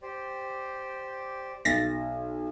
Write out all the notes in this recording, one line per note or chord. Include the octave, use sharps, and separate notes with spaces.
G4 C5 D5
B1 A6 A#6